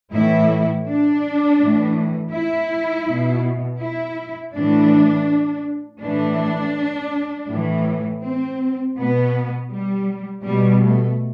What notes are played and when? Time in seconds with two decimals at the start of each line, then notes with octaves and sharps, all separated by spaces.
0.12 A2 E3 E4
0.87 D4
1.60 A2 E3
2.33 E4
3.08 B2
3.81 E4
4.54 A2 E3 D4
6.02 A2 E3 D4
7.50 A2 E3
8.23 C4
8.97 B2 B3
9.71 G3
10.44 B2 G3
10.82 A3